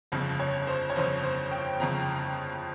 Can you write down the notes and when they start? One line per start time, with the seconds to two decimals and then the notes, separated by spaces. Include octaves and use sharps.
0.12 G1 F2 C#3
0.40 C#5
0.67 C5
0.90 C#5
0.96 G1 F2 C#3 C5
1.23 C5
1.51 G5
1.79 G1 F2 C#3 A#5